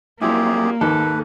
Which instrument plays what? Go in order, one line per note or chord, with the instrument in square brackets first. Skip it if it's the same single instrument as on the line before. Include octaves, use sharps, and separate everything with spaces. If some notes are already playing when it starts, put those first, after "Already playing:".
[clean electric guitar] F#2 F3 G3 [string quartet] A#3 [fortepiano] E4 [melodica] G4 G#4
[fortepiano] D#2 G#2 [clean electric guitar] A4 [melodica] B4